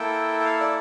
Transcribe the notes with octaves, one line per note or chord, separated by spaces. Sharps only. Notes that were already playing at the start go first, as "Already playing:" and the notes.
Already playing: A#3 E4 A4 G5
G5
F5
D5